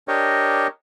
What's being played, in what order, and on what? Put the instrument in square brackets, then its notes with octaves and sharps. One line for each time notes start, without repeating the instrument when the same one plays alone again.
[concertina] D4 G4 A#4 C#5 D#5